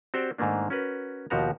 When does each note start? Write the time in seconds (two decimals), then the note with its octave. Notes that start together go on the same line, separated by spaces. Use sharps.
0.14 C4 F#4 G4 C5 D5
0.38 G#2 D#3 A3 A#3 D4
0.70 C#4 F#4 A#4 B4
1.30 D#2 B2 F3 F#4 G4 A#5